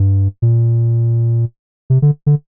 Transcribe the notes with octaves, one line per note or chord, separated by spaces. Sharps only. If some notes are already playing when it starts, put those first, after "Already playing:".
Already playing: G2
A#2
C3
D3
D3